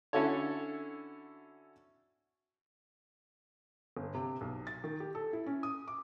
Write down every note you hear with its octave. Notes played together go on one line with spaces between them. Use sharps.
D3 C#4 E4 F#4 A4 C#5
G1
C3
B1
A6
D#3
G4
A4
E4
C#4
D#6
D6